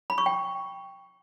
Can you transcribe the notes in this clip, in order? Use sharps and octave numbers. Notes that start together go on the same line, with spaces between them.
B5
C#6
G5